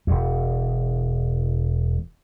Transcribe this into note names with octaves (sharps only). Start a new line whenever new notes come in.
E1 E2